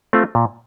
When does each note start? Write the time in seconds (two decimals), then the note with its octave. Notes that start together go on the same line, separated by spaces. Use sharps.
0.13 A3 C4 F4
0.35 A#2